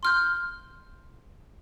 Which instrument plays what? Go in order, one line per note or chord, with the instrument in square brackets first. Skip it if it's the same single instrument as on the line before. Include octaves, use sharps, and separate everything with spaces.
[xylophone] C6 F6 G6